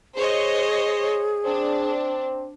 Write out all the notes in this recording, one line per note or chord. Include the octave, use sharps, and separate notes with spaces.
G#4 C5 C#5 D#5
C4 D4